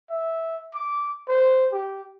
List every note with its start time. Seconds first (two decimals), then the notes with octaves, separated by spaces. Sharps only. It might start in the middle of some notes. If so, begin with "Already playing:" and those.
0.10 E5
0.75 D6
1.28 C5
1.72 G4